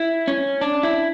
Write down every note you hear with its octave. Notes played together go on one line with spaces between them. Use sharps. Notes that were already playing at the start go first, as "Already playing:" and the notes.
Already playing: E4
C#4
D4
E4